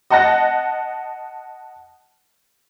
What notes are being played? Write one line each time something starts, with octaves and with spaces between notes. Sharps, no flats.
D#5 F#5 A5 F#6 A#6